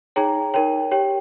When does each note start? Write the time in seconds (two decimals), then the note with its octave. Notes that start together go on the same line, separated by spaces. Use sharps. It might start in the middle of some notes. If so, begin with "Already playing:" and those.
0.16 D#4 G#4 C#5 G5 A#5
0.54 D#4 A#4 C#5 G5
0.91 G4 C#5 G5